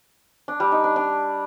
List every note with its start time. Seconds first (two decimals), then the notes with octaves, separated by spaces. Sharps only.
0.48 D4
0.60 G3
0.72 D#4
0.84 D4
0.96 D4